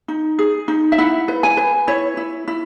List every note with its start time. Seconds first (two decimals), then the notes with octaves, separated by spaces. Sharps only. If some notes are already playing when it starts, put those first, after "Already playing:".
0.08 D#4
0.39 G#4
0.68 D#4
0.92 E5
0.98 E4 F#5
1.28 B4
1.43 G#5
1.57 B4
1.88 E4 C#5
2.17 E4
2.48 E4